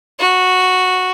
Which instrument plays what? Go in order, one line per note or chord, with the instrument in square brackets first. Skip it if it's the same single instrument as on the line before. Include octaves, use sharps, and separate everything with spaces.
[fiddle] F#4